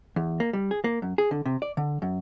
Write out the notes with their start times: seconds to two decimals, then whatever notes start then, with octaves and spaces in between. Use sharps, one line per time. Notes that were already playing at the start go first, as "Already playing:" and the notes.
0.16 E2
0.40 A#3
0.53 G3
0.71 G#4
0.84 A#3
1.02 F#2
1.18 G#4
1.31 D3
1.46 C3
1.62 D5
1.77 D3
2.02 F#2